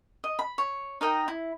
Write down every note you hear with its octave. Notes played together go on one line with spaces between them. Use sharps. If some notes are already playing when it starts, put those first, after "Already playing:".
D#5
B5
C#5
D#4 A#4 D#5 G5
E4